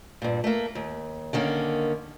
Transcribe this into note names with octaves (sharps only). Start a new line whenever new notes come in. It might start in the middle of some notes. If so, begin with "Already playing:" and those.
G2 A#2
A3 A#3
D#2
D3 D#3 A#3 C#4